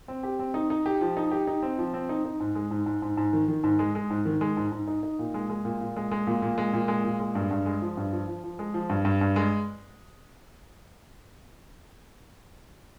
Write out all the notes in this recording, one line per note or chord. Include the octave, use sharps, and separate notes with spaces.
C4
G4
C4
D#4
D#4
G4
F3
D#4
G4
D#4
C4
F3
C4
D#4
D#4
G#2
G#3
G#2
G#2
G#2
G#2
D#3
D#3
G#2
G#3
G#3
G#2
D#3
G#3
G#2
G#2
D#4
D#4
A#2
G#3
G#3
A#2
A#2
G#3
G#3
A#2
A#2
G#3
A#2
G#3
A#2
G#3
G2
G2
G#3
F3
G2
F3
F3
F3
G#3
F3
G2
G2
G2
G#3